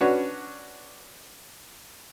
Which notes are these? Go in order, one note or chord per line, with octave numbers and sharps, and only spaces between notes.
C#4 D4 F#4 B4 C#5